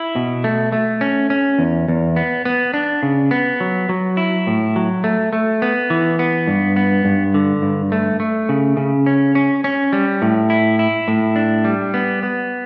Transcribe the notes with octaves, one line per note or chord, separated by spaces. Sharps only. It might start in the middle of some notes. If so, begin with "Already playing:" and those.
Already playing: E4
B2
A3
A3
C#4
C#4
E2
E2
B3
B3
D4
C#3
B3
F#3
F#3
E4
A2
F#3
A3
A3
B3
E3
B3
G2
B3
G2
D3
G2
A3
A3
C#3
C#3
C#4
C#4
C#4
G3
A2
E4
E4
A2
D4
G3
B3
B3